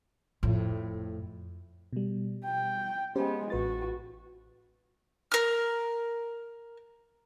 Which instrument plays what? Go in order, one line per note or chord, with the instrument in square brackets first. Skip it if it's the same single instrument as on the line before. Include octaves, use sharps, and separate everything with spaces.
[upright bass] F2 A2
[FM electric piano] B2 G3
[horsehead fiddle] G5
[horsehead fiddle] G#3 B3 [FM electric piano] C#4 G4 C5
[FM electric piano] A1 B4 A6 [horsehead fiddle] F#4
[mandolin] A#4 F6